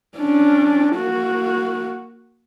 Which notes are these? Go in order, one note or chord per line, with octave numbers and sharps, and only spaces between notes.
C#4 D4
A#3 F#4